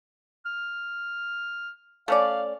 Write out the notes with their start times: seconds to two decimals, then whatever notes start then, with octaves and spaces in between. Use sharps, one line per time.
0.45 F6
2.08 A3 C#4 D5 F5